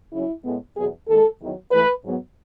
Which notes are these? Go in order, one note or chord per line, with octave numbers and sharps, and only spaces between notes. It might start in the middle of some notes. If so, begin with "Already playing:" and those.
C#3 F#3 C#4 E4
A2 G#3 B3
E2 B2 F#3 B3 G#4
D#2 D#3 G#3 A4
E2 D#3 F#3
G#2 E3 A3 B4
G#2 F#3 B3